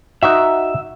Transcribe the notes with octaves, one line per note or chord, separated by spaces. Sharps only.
D#4 F#4 E5